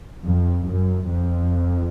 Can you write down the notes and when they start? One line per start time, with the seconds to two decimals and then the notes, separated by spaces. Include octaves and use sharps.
0.24 F2
0.67 F#2
1.09 F2